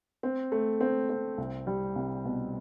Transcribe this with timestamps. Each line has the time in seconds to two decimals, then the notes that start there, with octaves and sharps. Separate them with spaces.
0.23 C4
0.52 A3
0.81 C4
1.09 C4
1.38 C2
1.67 G3
1.96 C2
2.25 B2